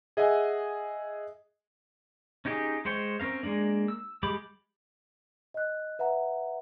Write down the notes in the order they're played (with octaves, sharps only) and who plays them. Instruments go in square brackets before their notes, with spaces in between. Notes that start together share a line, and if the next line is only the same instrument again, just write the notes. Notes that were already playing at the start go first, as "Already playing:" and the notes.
[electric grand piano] G#4 D#5 E5 F#5 G#5
[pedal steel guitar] C#4 D#4 G4 G#4
G#3 C5 C#5 G5
C4 C#4 A#4 F5
G#3 A#3 D4
E6
G3 G#3 G4 B5 D6
[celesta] D#5 F#6
B4 E5 F#5 A#5